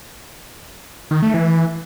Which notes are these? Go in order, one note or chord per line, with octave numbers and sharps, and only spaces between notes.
D#3
A3
E3